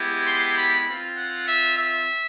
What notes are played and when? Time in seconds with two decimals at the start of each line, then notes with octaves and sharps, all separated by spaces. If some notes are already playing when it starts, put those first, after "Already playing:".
Already playing: G#3 B3 E4 G4
0.27 C6
0.57 B5
0.86 C4 F4
1.16 F#5
1.45 E5
1.76 E5